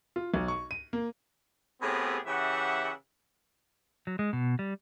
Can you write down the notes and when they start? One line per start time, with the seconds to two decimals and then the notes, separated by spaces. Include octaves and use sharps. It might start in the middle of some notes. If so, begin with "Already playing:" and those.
0.16 F4
0.34 B1
0.48 C#6
0.71 D#7
0.93 A#3
1.81 A2 B3 C4 G4 G#4
2.26 C#3 E3 G4 E5 F#5
4.07 F#3
4.19 G#3
4.33 B2
4.59 G3